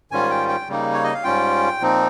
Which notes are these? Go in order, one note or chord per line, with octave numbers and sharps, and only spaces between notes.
G#2 D#3 G3 C#4 F4 G#5
G5
G5
C#3 G3 A#3 D#4
C#5
D#5
F5
G#2 G3 C#4 F4 G5
A#2 F3 C4 D#4